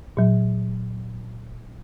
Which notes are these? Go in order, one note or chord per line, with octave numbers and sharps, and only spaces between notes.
A#2 F#3